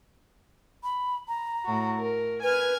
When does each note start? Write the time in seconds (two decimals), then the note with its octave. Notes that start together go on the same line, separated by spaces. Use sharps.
0.83 B5
1.28 A#5
1.65 A2 F#4
1.98 A#4
2.43 B4 G#5 F6 G#6